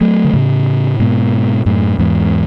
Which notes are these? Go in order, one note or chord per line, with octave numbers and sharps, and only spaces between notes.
F#3 A3
D3
A2 C#3
G#2 B2
F#2 A2
E2 G#2